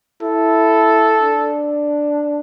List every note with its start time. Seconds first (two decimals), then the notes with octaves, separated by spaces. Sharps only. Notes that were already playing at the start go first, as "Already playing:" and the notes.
0.22 E4 A4
1.20 D4